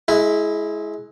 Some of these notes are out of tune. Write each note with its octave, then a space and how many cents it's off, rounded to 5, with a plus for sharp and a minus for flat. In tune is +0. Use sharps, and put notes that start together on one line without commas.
G#3 +20 E4 +0